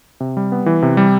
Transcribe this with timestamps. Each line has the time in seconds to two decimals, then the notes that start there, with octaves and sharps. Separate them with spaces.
0.20 C3
0.37 G3
0.52 B3
0.66 E3
0.82 C3
0.97 G3